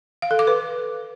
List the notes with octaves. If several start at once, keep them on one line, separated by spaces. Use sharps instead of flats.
F5
A4
D6
B4